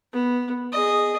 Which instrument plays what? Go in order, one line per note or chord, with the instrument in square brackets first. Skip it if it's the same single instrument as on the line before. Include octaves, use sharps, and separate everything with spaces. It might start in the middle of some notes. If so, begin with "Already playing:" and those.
[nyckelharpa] B3
G#4 D#5